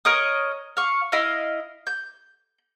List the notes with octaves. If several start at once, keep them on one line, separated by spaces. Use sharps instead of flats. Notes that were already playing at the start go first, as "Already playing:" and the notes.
A#4 C#5 D#5 D#6
F5 C#6
E4 D#5 F5
G6